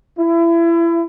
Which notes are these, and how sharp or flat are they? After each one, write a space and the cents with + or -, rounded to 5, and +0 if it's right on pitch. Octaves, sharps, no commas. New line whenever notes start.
E4 +30